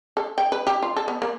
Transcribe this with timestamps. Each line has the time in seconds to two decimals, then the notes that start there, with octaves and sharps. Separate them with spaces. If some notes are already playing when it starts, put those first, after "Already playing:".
0.17 A4
0.38 G5
0.52 B4
0.67 G4
0.83 F4
0.96 A4
1.08 B3
1.22 A#3